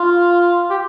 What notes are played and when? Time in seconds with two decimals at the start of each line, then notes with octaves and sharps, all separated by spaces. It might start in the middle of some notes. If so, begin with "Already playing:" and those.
Already playing: F4
0.70 G4